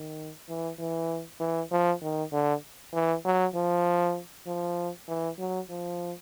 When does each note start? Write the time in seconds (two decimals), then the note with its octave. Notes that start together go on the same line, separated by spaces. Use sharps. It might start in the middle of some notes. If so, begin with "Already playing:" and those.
Already playing: D#3
0.49 E3
0.79 E3
1.40 E3
1.71 F3
2.02 D#3
2.32 D3
2.93 E3
3.25 F#3
3.55 F3
4.46 F3
5.08 E3
5.39 F#3
5.70 F3